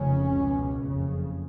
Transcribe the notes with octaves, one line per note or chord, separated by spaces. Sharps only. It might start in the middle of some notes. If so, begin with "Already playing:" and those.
Already playing: F1 F2 C#3 C#4
C#2 B2
F#1 F2 C#3